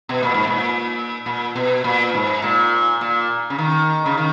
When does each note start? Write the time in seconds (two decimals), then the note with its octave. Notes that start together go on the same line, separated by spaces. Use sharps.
0.09 B2
0.23 A#2
0.34 G#2
0.47 A#2
1.26 A#2
1.55 B2
1.84 A#2
2.14 G#2
2.42 A#2
3.01 A#2
3.50 C#3
3.58 D#3
4.06 C#3
4.17 D#3